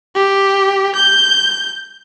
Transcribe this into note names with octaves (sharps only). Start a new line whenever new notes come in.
G4
G6